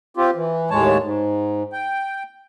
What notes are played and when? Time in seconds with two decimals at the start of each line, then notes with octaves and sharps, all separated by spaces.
0.17 C4 F4 G4
0.35 E3
0.71 D#2 A2 G#3 C#5 A5
1.02 G#2
1.73 G5